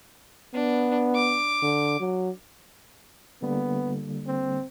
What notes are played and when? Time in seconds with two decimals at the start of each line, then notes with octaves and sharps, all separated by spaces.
0.54 B3 D4
1.16 D6
1.62 D3
2.00 F#3
3.42 D3 G3 A#3 B3
4.27 C4